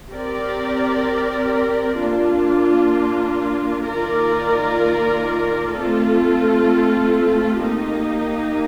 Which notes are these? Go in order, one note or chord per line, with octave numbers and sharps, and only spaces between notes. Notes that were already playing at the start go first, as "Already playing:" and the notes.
C4 G4 A#4 D5
A#3 D4 F4
D#3 A#3 F4 A#4 D5
A3 C4 F4 A4
A#3 D#4 G4